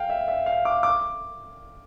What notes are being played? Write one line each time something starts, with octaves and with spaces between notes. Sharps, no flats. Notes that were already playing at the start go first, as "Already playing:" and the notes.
Already playing: F5 G5
E5
E5
F5
D6
D6